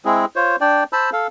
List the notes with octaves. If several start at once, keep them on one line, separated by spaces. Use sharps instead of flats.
G#3 C4 E4 G#4
F4 C5 C#5
D4 D5 G5
C5 A5 B5 E6
A4 F5